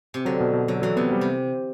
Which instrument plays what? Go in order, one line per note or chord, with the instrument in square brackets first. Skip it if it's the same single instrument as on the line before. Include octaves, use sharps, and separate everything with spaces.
[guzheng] C3
[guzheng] D3 [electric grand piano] F#3
[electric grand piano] B2
B2
[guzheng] D3 [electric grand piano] F#3
[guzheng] E3 [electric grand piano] F#3
[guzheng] C3 [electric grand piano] B3
[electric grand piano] G3
[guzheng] C3